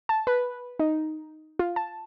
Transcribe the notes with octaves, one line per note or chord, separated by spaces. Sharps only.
A5
B4
D#4
F4
A5